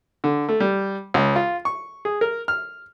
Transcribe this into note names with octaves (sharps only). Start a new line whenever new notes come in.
D3
A3
G3
C#2
F4
C#6
G#4
A#4
F6